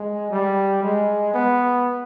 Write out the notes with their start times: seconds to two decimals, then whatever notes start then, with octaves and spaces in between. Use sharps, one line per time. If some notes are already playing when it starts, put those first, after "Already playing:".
Already playing: G#3
0.31 G3
0.83 G#3
1.34 B3